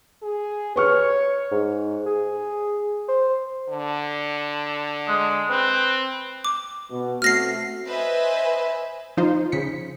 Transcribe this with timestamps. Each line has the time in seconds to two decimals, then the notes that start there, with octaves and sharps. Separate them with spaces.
0.23 G#4
0.76 B4 C#5 C#6 F6
1.52 G#2
2.06 G#4
3.08 C5
3.69 D3
5.08 G#3
5.50 C4 B4
6.45 D6
6.91 B2
7.22 A3 C4 F#4 F6 A#6 C7
7.86 B4 C5 D#5 E5 G#5
9.17 F3 D#4 F4 C5
9.52 C#3 B6 C#7